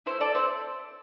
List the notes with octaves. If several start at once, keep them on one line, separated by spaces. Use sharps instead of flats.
A3 C4 E4 C5
A4 D5
A3 C4 E4 C5